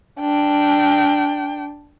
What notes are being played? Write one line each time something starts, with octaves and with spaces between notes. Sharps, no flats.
D4 G5